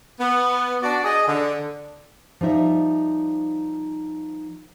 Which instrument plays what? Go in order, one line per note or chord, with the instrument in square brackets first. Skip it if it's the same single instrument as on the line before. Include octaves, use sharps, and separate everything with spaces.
[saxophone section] B3
D4 F#4 D5
G#4 D#5
D3
[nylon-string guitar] F3 G3 D#4 E5